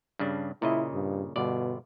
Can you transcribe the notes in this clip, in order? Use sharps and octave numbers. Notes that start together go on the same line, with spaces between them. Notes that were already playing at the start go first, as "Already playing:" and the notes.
G2 C#3 D4
A#2 C#3 E4 D#5
G2
G1 B2 D5